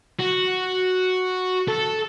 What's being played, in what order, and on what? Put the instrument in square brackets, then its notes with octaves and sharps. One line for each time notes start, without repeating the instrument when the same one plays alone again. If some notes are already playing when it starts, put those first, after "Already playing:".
[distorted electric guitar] F#4
A4